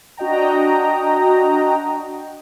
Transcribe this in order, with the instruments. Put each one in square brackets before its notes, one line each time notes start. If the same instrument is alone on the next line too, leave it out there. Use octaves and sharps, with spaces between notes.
[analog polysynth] D4 F#4 D#5 G5 A#5